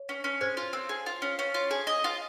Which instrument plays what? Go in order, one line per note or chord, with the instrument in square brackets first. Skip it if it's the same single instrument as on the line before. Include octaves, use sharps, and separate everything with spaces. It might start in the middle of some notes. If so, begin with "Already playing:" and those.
Already playing: [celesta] C#5
[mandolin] C#4
C#4
[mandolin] G#4 [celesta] C5
[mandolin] F4
C4
G#4
F4
C#4
C#4
F4
G#4
D#5
F4